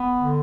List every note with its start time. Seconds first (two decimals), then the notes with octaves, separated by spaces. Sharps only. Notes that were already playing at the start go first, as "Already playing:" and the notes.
Already playing: B3
0.21 D3